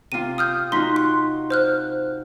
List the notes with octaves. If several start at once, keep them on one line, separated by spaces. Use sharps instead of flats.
C3 F4 D#7
D#6 F6 G6
D#4 F4 F#4 C6 B6
C6
C5 F6 F#6